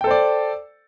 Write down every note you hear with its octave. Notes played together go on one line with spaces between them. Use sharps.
A4 C5 D5 G5